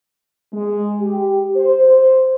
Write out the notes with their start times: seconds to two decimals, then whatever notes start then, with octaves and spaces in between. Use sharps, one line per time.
0.52 G#3
1.00 G4
1.56 C5